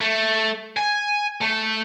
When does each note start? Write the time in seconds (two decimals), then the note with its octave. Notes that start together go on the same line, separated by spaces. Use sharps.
0.01 A3
0.77 G#5
1.42 A3